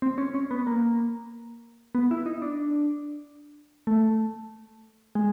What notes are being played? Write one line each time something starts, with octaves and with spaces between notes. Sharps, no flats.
C4
C#4
C#4
B3
A#3
B3
E4
D#4
D4
A3
G#3